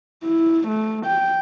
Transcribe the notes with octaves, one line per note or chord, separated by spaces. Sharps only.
E4
A3
G5